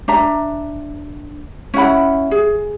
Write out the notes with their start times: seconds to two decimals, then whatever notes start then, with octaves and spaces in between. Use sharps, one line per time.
0.08 D4 E5 A#5
1.74 C#4 E4 F#5 B5
2.31 G#4